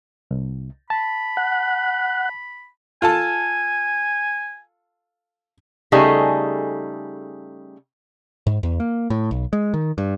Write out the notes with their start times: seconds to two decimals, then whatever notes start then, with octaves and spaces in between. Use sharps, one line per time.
0.31 C2
0.90 A5 B5
1.37 F#5 F#6
3.02 F4 A4 G#5 A5
5.92 C#3 G3 A3 D#4 G#4 A4
8.47 G#2
8.63 E2
8.80 A#3
9.10 A2
9.31 B1
9.53 G#3
9.74 D#3
9.98 G2